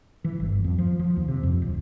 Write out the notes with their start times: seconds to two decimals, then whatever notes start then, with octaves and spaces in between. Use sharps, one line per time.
0.24 E3
0.40 G1
0.64 F2
0.79 F3
0.99 F3
1.16 D#2
1.28 C3
1.43 F2
1.62 D1